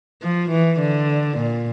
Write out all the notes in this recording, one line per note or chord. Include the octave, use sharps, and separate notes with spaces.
F3
E3
D3
A#2